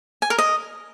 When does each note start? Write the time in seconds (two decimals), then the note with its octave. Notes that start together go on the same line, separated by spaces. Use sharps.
0.22 G#5
0.30 A#4
0.38 D#5